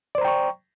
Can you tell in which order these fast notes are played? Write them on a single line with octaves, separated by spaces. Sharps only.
D5 C5 A#5 G5 C#6